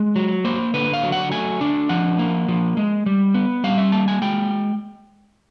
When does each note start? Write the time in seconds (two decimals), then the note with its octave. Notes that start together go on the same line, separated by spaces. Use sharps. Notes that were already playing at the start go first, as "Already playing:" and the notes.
Already playing: G#3
0.16 F#3
0.45 A#3 C5
0.74 D3 B4
0.93 F5
1.03 F#3
1.12 F#5
1.32 A3 G#5
1.61 D4
1.89 F3 F#5
2.19 A#3
2.48 F3
2.77 G#3
3.06 G3
3.34 B3
3.64 G3 F5
3.78 E5
3.92 A#3 A5
4.08 G#5
4.22 G#3 G5